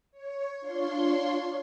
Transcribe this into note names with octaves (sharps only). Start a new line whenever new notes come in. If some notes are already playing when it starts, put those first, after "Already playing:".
C#5
D4 F4 C#5 C6